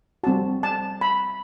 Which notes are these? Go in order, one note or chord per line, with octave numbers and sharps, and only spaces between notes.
G3 C4 F#4 A5
A5
B5